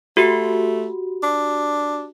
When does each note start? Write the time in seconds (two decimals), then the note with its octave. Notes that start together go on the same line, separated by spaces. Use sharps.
0.17 A3 F#4 G4
1.23 D4